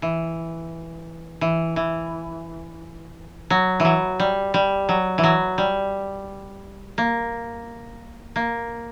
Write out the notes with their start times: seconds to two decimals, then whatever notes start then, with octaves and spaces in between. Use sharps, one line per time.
0.02 E3
1.41 E3
1.76 E3
3.50 F#3
3.80 E3
3.85 F#3
4.20 G3
4.54 G3
4.89 F#3
5.18 E3
5.24 F#3
5.58 G3
6.98 A#3
8.36 A#3